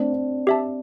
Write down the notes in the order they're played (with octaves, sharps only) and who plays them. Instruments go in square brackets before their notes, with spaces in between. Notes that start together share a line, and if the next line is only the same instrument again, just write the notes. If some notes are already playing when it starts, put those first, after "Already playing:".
Already playing: [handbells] A3 [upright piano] C4 D4
[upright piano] D4
[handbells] G4 E5 A5